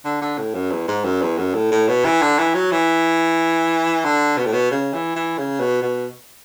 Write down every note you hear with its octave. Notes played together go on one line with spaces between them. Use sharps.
D3
D3
A2
F#2
E2
G#2
F#2
E2
F#2
A2
A2
B2
E3
D3
E3
F#3
E3
D3
B2
A2
B2
C#3
E3
E3
C#3
B2
B2